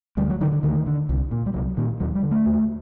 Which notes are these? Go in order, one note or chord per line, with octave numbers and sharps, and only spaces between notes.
D2 G3
F#3
D3 D#3
D3
D2 D#3
D3
C2
A#2
G3
C2 F#3
A#2 D#3
D#2 F#3
G3
D3
A3
D#2